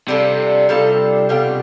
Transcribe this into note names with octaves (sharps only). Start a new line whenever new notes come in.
C3 G3 D4 F4 A4
G3 D4 F4 A4
B2 G3 D4 F4